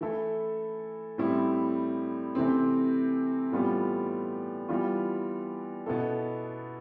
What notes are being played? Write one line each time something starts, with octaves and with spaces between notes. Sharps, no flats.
E3 A3 E4 A4
A2 G3 C4 E4
C3 E3 A3 C4
A2 E3 G3 B3 F4
E3 G3 B3 F4
B2 B3 E4 A4